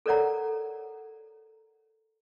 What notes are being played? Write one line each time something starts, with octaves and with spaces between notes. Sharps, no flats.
A4 A#4 C#5 D5 F#5 A#5